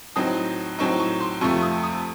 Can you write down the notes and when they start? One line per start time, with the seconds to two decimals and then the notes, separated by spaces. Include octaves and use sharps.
0.16 A2 F#3 C4 D#4 D#6
0.79 A2 F#3 C4 D#4 C#6
0.99 C#6
1.20 C6
1.41 F2 C3 F3 A3 C#6
1.62 D#6
1.83 D#6